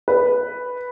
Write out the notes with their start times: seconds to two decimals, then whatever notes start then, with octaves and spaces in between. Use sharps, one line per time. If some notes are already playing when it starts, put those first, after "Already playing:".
0.08 B4